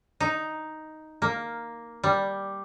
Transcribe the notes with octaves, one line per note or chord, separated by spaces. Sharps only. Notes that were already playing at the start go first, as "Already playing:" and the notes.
D#4
A#3
G3